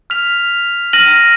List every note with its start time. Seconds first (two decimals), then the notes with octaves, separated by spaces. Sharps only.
0.10 F6 B6 F7
0.93 F6 A#6 D#7 F#7